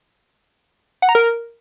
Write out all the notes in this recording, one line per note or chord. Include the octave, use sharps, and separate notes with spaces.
F#5
A#5
A#4